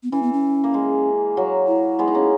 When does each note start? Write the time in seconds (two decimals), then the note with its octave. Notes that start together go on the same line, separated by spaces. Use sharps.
0.03 B3
0.12 E3 C#4
0.23 B3
0.33 C#4
0.64 A#3
0.74 G#3
1.37 F#3 A#3
1.68 E4
1.99 G#3 B3
2.08 D#4
2.15 A#3 C#4